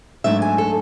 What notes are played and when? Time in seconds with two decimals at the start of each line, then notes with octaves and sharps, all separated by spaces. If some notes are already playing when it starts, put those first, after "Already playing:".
0.24 G#2 F#3 A3 D4 E5
0.42 G#5
0.58 A4